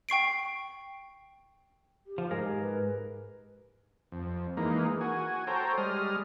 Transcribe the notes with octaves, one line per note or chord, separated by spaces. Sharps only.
G5 C#6 C7 D7
G4
F3
G#2 G#4 A#4
B4
F2
E3 G#3 A#3 D#4
F#4 G#5
A4 C5 C#5 G5 A#5
G3 G#3 D#6 F6